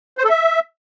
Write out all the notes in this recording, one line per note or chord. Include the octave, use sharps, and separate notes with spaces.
C5
A4
E5